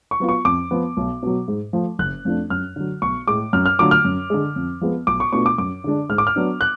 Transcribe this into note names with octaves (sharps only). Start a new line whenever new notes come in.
C#6
F#3 B3 F4
C#6
F2 D6
F3 B3
B1
B2 F#3
G#2
F3 A3
F#1 F#6
F2 F3 A3 D4
F#2 F6
D3 F#3
B1 C#6
A2 G#3 D6
F#2 F6
F6
D3 F#3 A3 F4 D6
F6
F#2
D3 G#3
F2
F3 G#3 B3
B1 D6
C#6
B2 A3 D4 F4 C#6
D6
F#2 D6
D3 G#3 D4
G#2 F6
D6
F6
F#3 B3 D4
F#6